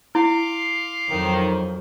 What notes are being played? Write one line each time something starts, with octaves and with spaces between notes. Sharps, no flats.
E4 F5 C6 D6
F2 D#3 F#3